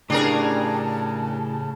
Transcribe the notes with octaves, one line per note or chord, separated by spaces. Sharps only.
A2 C#3 D4 G4 G#4 A#4 A5